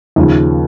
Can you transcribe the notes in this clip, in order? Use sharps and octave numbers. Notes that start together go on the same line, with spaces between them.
D#2 C#3 F3